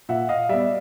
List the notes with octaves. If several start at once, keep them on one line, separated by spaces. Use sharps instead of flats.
A#2 E5 F#5
D#5 F5
G3 B3 D5 E5